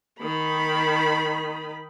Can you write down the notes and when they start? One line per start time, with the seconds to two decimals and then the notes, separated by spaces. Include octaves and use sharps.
0.20 D#3 B5